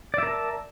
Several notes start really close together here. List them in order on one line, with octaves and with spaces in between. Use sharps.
D5 E5 A#4 A5